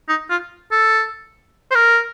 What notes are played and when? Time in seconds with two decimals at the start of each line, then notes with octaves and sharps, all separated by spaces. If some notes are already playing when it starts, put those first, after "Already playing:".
0.09 D#4
0.30 F4
0.72 A4
1.71 C5
1.75 A#4